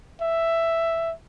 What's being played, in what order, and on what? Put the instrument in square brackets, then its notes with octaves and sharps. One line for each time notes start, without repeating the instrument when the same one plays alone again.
[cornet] E5